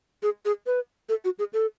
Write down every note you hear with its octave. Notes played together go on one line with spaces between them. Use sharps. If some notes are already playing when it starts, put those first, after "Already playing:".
G#4
G#4
B4
A4
F#4
G#4
A4